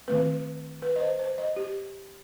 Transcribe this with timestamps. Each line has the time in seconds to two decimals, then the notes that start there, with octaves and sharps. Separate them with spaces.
0.08 D#3 A3 C4 B4
0.82 B4
0.96 D#5
1.00 C5
1.19 C5
1.38 D#5
1.56 G4